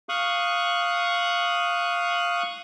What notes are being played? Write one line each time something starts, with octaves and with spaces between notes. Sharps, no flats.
F5 C#6 D#6 F#6